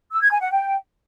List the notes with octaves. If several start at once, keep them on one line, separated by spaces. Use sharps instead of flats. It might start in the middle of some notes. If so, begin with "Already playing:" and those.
E6
G#6
G#5
F#5
G5